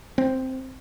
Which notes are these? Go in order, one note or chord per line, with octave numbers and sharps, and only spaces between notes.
C4